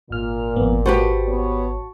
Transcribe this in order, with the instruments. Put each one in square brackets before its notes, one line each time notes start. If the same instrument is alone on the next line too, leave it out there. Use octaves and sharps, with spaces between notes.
[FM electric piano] G#1 F6 [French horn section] A#2
[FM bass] G#1 [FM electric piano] F2 B3
[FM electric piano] F#4 A5 C#6 [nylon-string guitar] G4 B4 C5
[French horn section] B3 C#5